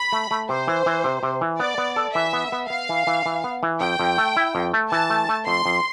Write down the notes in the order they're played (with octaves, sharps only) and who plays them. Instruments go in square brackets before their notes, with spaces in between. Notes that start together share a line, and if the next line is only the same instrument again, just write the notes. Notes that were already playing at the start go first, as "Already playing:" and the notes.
Already playing: [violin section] B5
[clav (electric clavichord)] A3
A3
[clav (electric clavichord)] C3 [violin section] C5
[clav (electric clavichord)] E3
E3
C3
C3
E3
[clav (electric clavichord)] B3 [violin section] D5
[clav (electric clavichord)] B3
A4
[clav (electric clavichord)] E3 [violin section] E5
[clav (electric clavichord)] B3
B3
[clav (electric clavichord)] B3 [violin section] F5
[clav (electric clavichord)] E3
E3
E3
B3
E3
[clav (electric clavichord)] F2 [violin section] G5
[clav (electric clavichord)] F2
A3
E4
F2
A3
[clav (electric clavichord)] E3 [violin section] A5
[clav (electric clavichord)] A3
A3
[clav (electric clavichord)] F2 [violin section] C6
[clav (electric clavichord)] F2